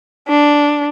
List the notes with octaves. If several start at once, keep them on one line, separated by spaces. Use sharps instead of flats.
D4